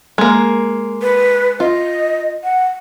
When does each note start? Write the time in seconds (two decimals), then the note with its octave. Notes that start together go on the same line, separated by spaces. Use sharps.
0.18 G#3 A#3
1.02 B4
1.60 F4 D#5
2.44 F#5